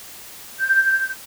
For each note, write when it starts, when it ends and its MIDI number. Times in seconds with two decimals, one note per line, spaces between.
0.59 1.08 91